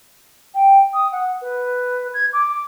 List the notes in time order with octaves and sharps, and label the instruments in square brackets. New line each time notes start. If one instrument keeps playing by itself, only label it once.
[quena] G5
D#6
F#5
B4
G#6
D6